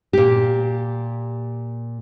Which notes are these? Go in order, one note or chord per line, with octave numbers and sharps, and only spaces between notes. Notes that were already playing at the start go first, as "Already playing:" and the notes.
A#2 G4